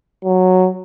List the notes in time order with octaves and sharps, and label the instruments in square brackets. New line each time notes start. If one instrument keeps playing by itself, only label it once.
[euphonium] F#3